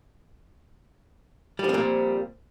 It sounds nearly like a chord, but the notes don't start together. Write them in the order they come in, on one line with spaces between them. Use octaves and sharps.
G3 F3 C4 A#2